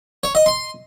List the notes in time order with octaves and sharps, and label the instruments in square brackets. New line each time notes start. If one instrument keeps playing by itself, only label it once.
[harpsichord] C#5
D#5
C6